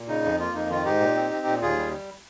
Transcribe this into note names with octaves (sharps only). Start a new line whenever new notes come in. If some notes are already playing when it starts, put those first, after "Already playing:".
Already playing: A#2
C#3 D#4
F2
A#3 F4
F2 D#4
D#3 F4
G#2 D#4 G4
A#2
C4
C4
A#2
D#2 F4 G#4
G3